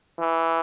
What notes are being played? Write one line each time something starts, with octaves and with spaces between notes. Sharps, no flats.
E3